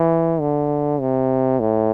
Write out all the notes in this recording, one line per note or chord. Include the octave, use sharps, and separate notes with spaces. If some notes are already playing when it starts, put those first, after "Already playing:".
Already playing: E3
D3
C3
A2